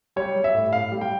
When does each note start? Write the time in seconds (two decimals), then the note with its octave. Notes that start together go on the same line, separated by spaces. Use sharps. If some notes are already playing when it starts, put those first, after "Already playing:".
0.16 G3 C#5
0.36 G3
0.44 E5
0.55 A2
0.73 A2 F5
0.92 G3
1.01 G5